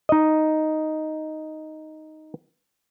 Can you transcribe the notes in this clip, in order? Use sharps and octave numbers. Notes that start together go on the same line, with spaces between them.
D#4 D#5